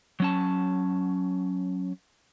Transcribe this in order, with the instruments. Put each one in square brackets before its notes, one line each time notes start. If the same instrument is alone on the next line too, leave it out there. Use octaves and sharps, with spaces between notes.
[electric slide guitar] F#3 C#4 A5